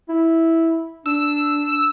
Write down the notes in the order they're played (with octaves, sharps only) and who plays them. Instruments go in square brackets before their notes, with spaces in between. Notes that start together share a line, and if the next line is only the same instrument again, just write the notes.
[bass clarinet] E4
[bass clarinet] D4 [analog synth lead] E6